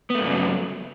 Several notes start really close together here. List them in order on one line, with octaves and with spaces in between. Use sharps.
B3 A3 G2 C#3 F#3